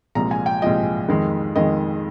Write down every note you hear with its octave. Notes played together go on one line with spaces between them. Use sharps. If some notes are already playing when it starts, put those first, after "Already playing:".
C2 A#2 F3 G#3 A#5
G#5
G5
C2 A#2 F3 G#3 D#5
F2 D#3 G#3
F2 D#3 G#3 D#5